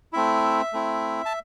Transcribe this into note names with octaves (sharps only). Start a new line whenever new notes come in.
A3 C4 E4 E5
A3 C4 E4
A5